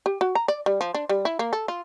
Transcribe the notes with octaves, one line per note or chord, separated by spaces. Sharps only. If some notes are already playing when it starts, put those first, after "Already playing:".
G4
F#4
A#5
D5
G3
F3
D4
G3
E4
A#3
A4
F4